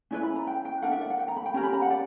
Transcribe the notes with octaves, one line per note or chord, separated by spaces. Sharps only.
C#4 E4 G4 B4 D5
B5
A#5
G5
G5
D4 A#4 F#5
E5
D5
F#5
G5
A#5
B5
G5
C#4 G4 A#4 A#5
B5
A#5
F#5
D5